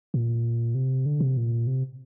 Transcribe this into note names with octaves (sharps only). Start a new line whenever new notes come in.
A#2
C3
D3
C3
A#2
C3